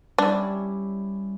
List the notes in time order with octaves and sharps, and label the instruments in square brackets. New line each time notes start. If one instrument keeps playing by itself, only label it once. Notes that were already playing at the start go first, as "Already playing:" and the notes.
[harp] G3 C#4 E4 [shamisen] D4